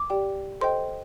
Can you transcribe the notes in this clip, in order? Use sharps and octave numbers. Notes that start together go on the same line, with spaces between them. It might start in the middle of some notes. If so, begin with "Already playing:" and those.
Already playing: D6
G4 D5 G5
A4 C5 D#5 G5 C6